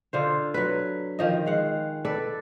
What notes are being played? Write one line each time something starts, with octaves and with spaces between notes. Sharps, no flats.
D3 F4 C5
F#3 B4
D#3 F3 D#5
G#3 F5 F#5
A4 B4 D5